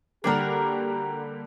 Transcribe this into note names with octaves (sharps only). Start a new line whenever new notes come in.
D3 G3 A#3 D4 F#4 G4 A#4